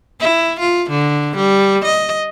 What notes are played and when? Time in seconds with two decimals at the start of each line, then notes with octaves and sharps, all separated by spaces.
0.20 E4
0.60 F4
0.90 D3
1.36 G3
1.84 D#5